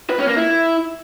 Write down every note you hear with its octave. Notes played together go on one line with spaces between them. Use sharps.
B4
C#4
A#3
E4